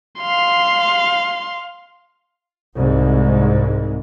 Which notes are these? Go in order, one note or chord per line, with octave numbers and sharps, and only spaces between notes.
F5 C6
C2 G#2